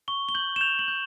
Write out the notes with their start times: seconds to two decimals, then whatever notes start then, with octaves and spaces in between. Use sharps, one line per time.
0.08 C#6 G7
0.29 G7
0.35 G6 F#7
0.56 E7
0.61 G6 F7
0.79 F#7
0.88 G6